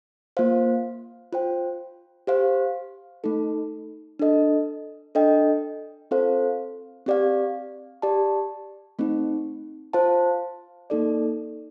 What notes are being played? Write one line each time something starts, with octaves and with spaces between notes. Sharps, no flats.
A#3 F4 C5 F5
F4 C5 G5
G4 C5 F5
A3 D#4 A4
D4 A4 D#5
D4 A4 D#5 G5
C4 F4 A4 C5 F5
C4 G4 D5 F5
G4 D5 A5
A3 C4 D#4
F4 C5 F5 A5
A#3 D#4 A4 D5